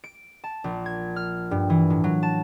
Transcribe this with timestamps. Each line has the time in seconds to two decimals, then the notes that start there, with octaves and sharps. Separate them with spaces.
0.04 D7
0.44 A5
0.64 A#1
0.86 G#6
1.16 F6
1.51 G2
1.70 E3
1.90 A2
2.04 F#3
2.23 A5